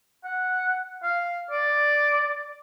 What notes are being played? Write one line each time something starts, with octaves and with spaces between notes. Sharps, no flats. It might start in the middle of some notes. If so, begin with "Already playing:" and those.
F#5
F5
D5